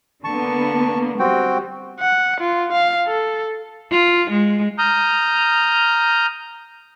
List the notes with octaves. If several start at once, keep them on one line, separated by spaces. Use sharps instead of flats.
D3 A#3 B3 A5 C#6
G3 C4 F#4 G5
F#5
F4
F5
A4
F4
G#3
A#5 D#6 F6 G6